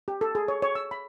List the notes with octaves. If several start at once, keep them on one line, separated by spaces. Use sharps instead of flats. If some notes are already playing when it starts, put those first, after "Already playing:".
G4
A4
G#4
C#5
C#5
E6
B5